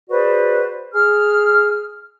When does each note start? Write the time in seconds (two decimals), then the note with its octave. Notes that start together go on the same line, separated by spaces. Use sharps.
0.10 F#4 G#4 B4 C5 D5
0.94 G#4 F6